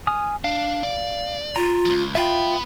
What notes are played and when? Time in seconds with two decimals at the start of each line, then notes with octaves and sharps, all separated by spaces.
0.07 G#5 D#6 F6
0.44 D4 F5
0.83 D5
1.56 F4 A#5
1.85 C#2 F3
2.15 B3 F4 E5 F5 G5 B5